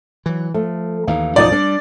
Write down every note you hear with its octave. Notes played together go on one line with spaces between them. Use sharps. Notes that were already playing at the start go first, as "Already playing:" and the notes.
E3 F#3
F3 A3
D#2 E3 D#4 F5
B1 F#2 A2 F3 D#4 D5 D#5
G3 D4